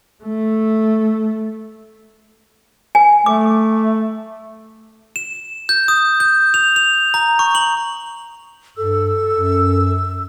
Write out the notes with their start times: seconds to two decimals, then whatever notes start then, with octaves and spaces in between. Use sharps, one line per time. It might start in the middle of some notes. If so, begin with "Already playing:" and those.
0.23 A3
2.95 G#5
3.26 A3 D6
5.16 E7
5.69 G6
5.88 D#6
6.20 G6
6.54 F7
6.76 F7
7.14 A#5
7.39 C#6
7.55 F#7
8.77 G2 A4 E6
9.32 F#2